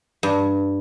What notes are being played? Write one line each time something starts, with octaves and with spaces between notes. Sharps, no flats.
G2